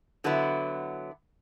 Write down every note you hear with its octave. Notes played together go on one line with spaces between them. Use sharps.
D3 F#3 B3 E4